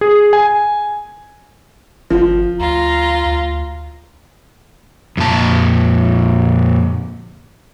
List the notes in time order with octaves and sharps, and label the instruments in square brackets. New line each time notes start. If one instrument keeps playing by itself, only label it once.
[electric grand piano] G#4
G#5
[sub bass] G1 [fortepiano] F3
[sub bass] D2 [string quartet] F4 [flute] A#5
[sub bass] D2
[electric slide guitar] F2 A#2 A5